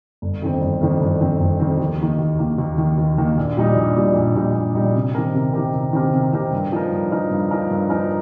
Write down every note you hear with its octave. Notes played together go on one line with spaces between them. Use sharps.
G1
F2 D#3 C4
G1
F2 D#3 C4
G1
F2 D#3 C4
G1
F2 D#3 C4
D#2
D#3 A#3
D#2
D#3 A#3
D#2
D#3 A#3
D#2
D#3 A#3
A#1
A#2 G3 D#4
A#1
A#2 G3 D#4
A#1
A#2 G3 D#4
A#1
A#2 G3 D#4
C3
D#3 C4 G4 A#4
C3
D#3 C4 G4 A#4
C3
D#3 C4 G4 A#4
C3
D#3 C4 G4 A#4
G2
F3 D#4 A#4
G2
F3 D#4 A#4
G2
F3 D#4 A#4
G2
F3 D#4 A#4